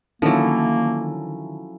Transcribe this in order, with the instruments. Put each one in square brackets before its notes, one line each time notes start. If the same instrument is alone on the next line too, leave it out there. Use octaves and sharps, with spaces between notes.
[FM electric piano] D3 D#3 [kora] F3 F#3 [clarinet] A#3 [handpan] C#4 E4 A4